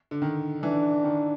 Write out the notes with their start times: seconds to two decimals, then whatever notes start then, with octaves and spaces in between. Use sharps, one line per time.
0.11 D3
0.22 D#3
0.62 E3 D4
1.04 D#3